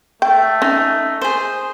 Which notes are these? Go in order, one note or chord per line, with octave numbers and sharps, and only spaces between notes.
A3 G5
C#4 D#4
G#4 C5